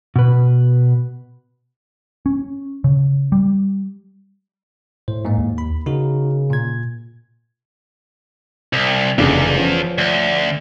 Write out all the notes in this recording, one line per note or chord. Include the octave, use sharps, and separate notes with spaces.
B2 B4
C#4
C#3
G3
A2 C5
G#2 A#3
D#2
B5
C#3 D#4 F#4 A#4
A#2 G#6
C2
F1 E2 C#3 D4
F3 C#4
D2